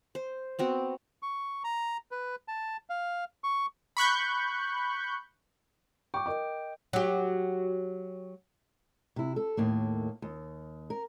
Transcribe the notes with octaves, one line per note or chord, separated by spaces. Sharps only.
C5
B3 C4 F#4
C#6
A#5
B4
A5
F5
C#6
B5 C#6 F#6 G6
G5 C#6 D6
A#4 D#5 D6
F#3 G4
C3 E4
A4
D#2 A2 A#3
D#2
A#4